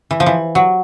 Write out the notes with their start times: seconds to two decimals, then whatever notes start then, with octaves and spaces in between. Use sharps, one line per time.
0.11 E3
0.20 F3
0.26 E3
0.55 F#3